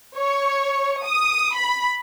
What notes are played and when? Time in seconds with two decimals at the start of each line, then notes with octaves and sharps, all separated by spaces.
0.16 C#5
1.05 D#6
1.56 B5